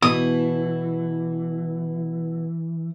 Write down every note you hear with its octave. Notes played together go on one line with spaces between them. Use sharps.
B2 E3 E4 D#6